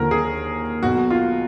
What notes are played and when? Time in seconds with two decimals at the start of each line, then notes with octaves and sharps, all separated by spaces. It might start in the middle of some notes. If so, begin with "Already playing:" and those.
Already playing: D#2 D3 F3 A#4
0.11 G#4
0.83 B1 B2 F#4
1.11 F4